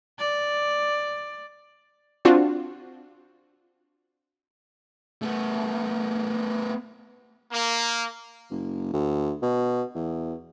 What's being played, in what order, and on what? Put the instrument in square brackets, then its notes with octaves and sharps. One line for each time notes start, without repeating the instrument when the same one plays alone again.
[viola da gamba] D5
[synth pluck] C4 D4 F4 F#4
[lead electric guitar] A3 B3
[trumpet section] A#3
[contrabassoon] F#1
D2
B2
E2